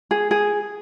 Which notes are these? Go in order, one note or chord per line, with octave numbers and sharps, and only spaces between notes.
G#4
G#4